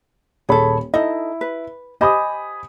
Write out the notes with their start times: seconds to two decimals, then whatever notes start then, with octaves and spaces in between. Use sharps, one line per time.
0.49 D#1 G#4 A4 C#5 B5
0.94 D#4 E4 A4 D#5
1.41 B4
2.01 G4 C5 D#5 G#5 B5 D#6